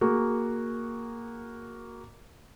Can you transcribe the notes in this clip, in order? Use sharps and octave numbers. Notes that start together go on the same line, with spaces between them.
A#3 F#4 G#4